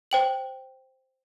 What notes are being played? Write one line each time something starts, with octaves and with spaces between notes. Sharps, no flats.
C5 G5 F#7